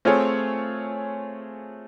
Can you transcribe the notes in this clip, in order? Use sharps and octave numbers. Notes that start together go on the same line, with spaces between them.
A3 C4 F4 G#4 C#5